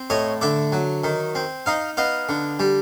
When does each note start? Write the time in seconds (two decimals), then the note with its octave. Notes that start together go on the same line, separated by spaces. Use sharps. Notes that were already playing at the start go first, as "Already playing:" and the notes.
Already playing: C4
0.10 A2 C#5 D#5
0.41 D3 D5 E5
0.72 F#3
1.04 D#3
1.35 C4
1.66 D#4 D#5 F5
1.97 B3 D#5 F5
2.29 D3
2.59 G3